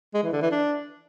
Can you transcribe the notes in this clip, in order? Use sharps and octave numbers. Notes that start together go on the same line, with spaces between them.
G#3
E3
D3
E3
D4